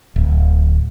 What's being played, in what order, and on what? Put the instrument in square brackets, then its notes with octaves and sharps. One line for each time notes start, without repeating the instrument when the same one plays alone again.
[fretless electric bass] D1